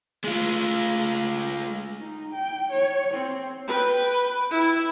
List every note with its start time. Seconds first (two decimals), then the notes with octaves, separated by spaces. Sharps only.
0.24 G#3 A3 F4
1.99 D#4
2.34 G5
2.70 C#5
3.14 C4
3.68 B4 G5
4.51 E4